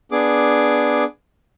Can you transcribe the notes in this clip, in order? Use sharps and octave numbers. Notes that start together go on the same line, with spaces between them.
B3 D4 G#4 D6